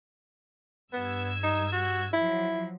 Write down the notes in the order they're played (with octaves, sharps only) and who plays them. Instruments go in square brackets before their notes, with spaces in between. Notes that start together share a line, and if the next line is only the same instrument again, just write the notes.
[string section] G2 E6 G#6 [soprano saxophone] B3
[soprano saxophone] D#4
F#4
[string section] F3 F#3 [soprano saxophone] E4